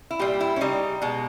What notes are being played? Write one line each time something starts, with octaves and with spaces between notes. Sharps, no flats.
E4
A#2 G3 G4
E4
C#4
C#3 G3 D#4
B2 G#3